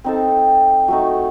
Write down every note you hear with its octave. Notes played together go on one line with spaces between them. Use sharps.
C4 D#4 A4
F#3 A3 D#4